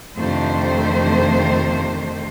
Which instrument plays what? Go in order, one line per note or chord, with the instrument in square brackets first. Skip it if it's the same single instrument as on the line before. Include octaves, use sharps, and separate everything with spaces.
[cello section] F2 C3 D#3 A3 D4 C5